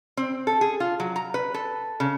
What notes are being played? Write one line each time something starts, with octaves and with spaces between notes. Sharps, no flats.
C4
A4
G#4
F4
F#3
A#5
B4
A4
C#3